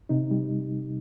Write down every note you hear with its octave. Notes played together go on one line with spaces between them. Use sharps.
C3 D#4
G3